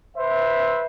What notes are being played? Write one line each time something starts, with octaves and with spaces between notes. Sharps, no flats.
B4 C5 E5